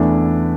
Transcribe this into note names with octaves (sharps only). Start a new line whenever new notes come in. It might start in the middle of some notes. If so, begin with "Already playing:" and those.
Already playing: E2 E3 A3 D4